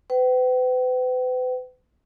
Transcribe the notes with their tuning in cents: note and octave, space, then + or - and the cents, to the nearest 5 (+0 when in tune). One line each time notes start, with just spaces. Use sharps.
B4 +40 G5 -40